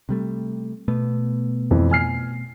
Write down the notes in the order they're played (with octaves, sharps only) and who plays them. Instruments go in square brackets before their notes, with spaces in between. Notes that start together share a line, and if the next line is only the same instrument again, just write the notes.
[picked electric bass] C3 G3 A3
B2 A3 B3
[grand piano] F2 E3 F3
G#5 F6 C7